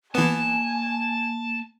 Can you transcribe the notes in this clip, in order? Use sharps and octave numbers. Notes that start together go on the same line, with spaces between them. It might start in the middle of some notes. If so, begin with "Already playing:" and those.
E3 A#3 B3 G#5 A5